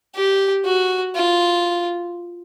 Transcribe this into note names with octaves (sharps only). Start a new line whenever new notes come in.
G4
F#4
F4